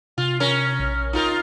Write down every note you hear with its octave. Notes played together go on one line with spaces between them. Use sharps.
C3 F4
C#4 A#4
A#1
D#4 F4 A#4